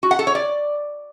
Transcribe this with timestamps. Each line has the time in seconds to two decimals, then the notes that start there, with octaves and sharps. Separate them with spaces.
0.03 F#4
0.11 F#5
0.19 A4
0.27 C#5
0.35 D5